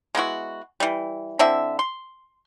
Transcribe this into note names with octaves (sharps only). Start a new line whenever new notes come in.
G#3 B3 E4 F#4
E3 G3
D3 C4 E4 E5
C6